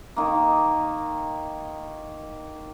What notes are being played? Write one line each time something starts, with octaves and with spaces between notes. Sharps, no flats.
D#3 A#3